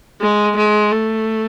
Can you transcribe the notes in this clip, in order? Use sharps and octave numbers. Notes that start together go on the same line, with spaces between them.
G#3
G#3
A3